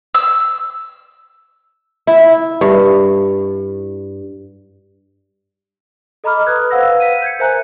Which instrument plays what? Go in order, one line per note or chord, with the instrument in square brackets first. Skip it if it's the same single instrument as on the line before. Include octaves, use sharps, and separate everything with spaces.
[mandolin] E6
[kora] E4
G2
[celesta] A4 D#5 A#5 B5 D6 F6
B4 D#6 F#6 G#6
B4 C5 F5 F#5 E6 A#6
B6 D#7
G6 G#6 C#7
A#4 C5 E5 G#5 A#5 F#6